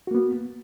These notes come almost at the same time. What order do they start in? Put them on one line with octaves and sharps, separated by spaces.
F#4 A#3 B3